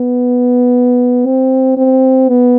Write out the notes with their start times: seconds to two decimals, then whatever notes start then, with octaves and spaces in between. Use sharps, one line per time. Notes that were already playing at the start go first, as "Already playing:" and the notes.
Already playing: B3
1.26 C4
1.77 C4
2.28 B3